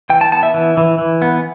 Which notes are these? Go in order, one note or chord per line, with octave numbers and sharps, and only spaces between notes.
E3 G5
A5
B3 A5
E5
E3
E3
E3
B3